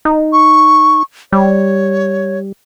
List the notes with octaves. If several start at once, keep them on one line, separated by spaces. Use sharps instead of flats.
D#4
C#6
G3 C#5